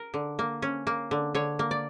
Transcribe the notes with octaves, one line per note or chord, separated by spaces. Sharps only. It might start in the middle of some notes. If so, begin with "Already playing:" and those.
Already playing: A#4
D3
A#3
C#4
A#3
D3
D3 C#5
A#3
D5